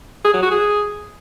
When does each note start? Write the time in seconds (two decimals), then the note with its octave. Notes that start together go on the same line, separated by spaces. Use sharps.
0.25 G#4
0.33 F#3
0.42 F#4
0.51 G#4